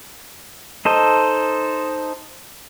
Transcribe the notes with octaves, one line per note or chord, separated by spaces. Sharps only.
D#4 A4 C5 D#5